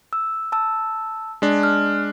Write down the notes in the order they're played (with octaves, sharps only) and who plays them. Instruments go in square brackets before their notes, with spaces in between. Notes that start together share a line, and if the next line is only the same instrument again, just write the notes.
[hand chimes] E6
A5 E6
[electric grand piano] G#3 D4
[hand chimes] F6